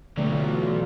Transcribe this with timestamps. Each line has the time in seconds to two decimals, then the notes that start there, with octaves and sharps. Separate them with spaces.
0.17 B1 D3 E3 F#3 G3 A3 F4